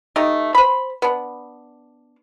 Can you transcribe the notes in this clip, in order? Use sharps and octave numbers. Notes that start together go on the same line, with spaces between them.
A3 D#4 G4 D#5
C5 B5
B3 D4